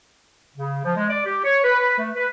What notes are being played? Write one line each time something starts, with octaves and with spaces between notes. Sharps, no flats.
C#3
F3
G#3
D5
G4
C#5
B4
A3
B4